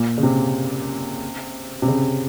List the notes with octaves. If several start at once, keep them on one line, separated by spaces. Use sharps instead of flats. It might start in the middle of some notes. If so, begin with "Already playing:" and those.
Already playing: A#2
C#3
C3
C3
C#3